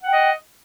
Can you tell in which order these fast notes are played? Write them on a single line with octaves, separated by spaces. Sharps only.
F#5 G5 D#5